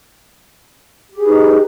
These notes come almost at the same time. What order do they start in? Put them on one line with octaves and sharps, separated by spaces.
G4 G#4 B4 D#4